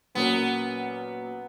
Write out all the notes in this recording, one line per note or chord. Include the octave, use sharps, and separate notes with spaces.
A#2 F#3 A#3 B3 C#4